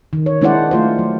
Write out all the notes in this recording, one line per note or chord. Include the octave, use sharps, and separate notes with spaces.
D#3
C#5
G#3 D4 E4 C5 D5 F#5
A3 F4 C5
F#3